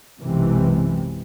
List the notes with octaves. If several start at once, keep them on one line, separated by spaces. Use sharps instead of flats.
B1 F#2 C3 E3 G#3